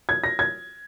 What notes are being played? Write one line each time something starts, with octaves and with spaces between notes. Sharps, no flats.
G#6
A#6
G#6